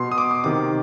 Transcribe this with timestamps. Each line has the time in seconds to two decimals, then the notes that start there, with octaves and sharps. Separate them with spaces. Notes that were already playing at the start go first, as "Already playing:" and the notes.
Already playing: B2 C6
0.12 D#6
0.18 D6
0.31 D6
0.44 C3 D#3 D6